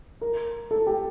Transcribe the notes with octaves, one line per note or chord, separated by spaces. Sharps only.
A#4
A4
G4